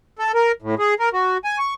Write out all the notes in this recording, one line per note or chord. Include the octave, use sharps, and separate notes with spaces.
A4
A#4
A2
G#4
A#4
F#4
G#5
C#6